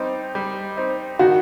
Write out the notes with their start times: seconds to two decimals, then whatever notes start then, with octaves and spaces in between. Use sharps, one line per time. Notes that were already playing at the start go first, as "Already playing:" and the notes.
Already playing: G3 C4 D#4
0.35 G3
0.77 C4 D#4
1.19 D#3 F#4